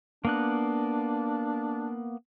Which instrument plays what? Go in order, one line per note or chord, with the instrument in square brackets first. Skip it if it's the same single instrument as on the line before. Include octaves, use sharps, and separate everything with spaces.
[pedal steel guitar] A#3 B3 F#6 [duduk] D4